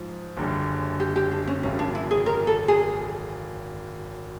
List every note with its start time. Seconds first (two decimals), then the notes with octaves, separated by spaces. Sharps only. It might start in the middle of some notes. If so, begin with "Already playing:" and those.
Already playing: G#2 F3
0.37 F#1 F#2 D3 G3
1.00 G4
1.16 G4
1.31 D4
1.47 C#4
1.63 G#1 F#2 C#3 C#4
1.79 D4
1.95 E4
2.11 G#4
2.26 A#4
2.47 A4
2.68 G#4